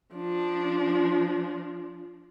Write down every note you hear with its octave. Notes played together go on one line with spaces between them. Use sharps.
F3 D4